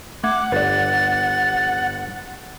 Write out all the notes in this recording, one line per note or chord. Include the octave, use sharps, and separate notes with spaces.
A3 F#5 D6 G#6
G1 B4 D5 A6